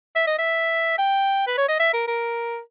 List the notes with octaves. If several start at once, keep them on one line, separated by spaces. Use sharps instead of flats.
E5
D#5
E5
G5
B4
C#5
D#5
E5
A#4
A#4